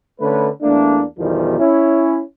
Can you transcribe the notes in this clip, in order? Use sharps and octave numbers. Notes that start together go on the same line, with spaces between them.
D3 A3 C#4 B4
E2 A3 A#3 D4
B1 E2 B2 D#3 F3 G3
C#4 E4